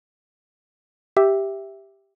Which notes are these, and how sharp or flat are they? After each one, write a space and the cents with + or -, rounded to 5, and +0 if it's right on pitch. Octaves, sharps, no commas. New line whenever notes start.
G4 +0 E5 +0